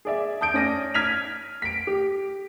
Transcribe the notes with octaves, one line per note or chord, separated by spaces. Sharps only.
G#4 D5 E5
A5 D#6 G6 D7
C#4 D5 A#6 D#7
F6 G#6 B6 D#7 F7
B6 D7
G4